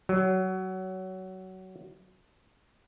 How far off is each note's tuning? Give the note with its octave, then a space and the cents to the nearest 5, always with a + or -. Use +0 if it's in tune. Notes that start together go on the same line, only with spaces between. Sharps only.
F#3 +20